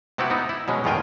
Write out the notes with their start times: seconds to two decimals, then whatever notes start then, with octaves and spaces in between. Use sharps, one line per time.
0.18 C3 B3 C4 E4 F#4 G4
0.30 B3 D#4
0.49 E4
0.68 B2 F#3 G#3 C#4
0.84 E2 A2 D#3 F4 G5 G#5